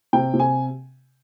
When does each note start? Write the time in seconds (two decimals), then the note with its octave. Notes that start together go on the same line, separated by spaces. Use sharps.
0.13 C3 G5
0.34 C3
0.40 G#5